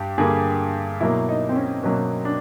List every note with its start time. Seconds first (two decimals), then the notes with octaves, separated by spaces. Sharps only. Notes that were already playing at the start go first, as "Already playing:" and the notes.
Already playing: G2 G4
0.18 G2 D3 G3 A#3 G#4
1.01 B2 F#3 A#3 E4
1.29 D#4
1.49 C4
1.56 C#4
1.83 B2 F#3 A#3 C#4
2.25 D4